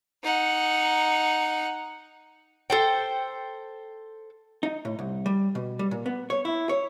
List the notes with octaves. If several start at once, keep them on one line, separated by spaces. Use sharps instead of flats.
D#4 F#5
A4 C5 G5
D#4
A2
C2
G3
B2
G3
A#2
B3
C#5
E4
C#5